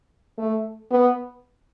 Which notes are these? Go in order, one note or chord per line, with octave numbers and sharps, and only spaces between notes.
A3
B3